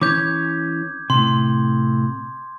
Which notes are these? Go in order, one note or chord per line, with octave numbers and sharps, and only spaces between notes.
E3 C#4 C#5 D6 G6 G#6
A2 C3 C6